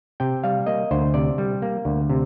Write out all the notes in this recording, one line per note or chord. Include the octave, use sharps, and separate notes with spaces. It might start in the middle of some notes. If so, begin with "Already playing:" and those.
C3 G5
G3 F5
A#3 D#5
D2 C5
C3 D5
G3
A#3
D2
C3